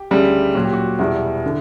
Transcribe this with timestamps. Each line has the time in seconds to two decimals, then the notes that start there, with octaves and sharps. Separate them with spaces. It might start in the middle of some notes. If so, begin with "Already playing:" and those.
Already playing: G4
0.11 D2 C#3 G3
0.55 A#2 F#3 F#4
0.64 G4
0.74 F#4
0.99 E2 B2 G3 E4
1.46 D3